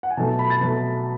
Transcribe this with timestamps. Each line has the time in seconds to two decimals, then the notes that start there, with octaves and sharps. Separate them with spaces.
0.03 F#5
0.10 G#5
0.17 B2 F#3 A3 A5
0.28 A5
0.39 B5
0.50 A6
0.61 B2 F#3 A3